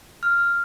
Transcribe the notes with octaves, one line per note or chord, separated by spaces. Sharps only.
F6